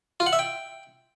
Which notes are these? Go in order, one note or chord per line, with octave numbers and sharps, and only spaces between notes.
F4
F#5
E5
G5